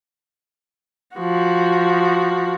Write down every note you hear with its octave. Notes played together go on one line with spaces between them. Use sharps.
F3 F#4